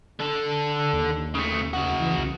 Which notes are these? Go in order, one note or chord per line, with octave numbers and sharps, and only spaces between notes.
D3 A4
D#2
C#3 A3
C#3 F#4
E3
C2